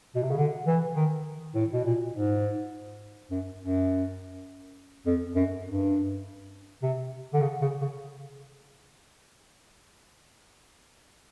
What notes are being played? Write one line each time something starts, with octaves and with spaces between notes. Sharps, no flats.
B2
C3
C#3
D3
E3
D#3
A2
B2
A#2
G#2
F#2
F#2
F2
F#2
G2
C3
D3
C#3
C#3
C#3